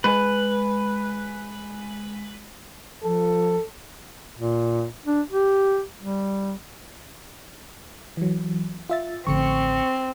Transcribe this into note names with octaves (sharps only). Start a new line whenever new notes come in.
G#3 B4 G#5
F3 A4
A#2
D4
G4
G3
E3 F#3
F4 E5 A6
A1 D3 F3 C4 C#6 C#7